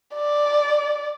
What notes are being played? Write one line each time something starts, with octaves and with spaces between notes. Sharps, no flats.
D5